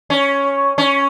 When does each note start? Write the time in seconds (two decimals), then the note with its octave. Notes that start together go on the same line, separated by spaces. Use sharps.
0.10 C#4
0.78 C#4